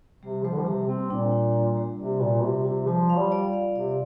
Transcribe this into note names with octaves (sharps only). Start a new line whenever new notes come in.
C3 G3
F3 G3
D3
F3
C3 G3
A#3 C4
A#2 D4
D4
D4
G3
C3 D5
A#2 F4
C3 D5
C3 F4
F3 F4
F5
G3
D5
F5
C3 D5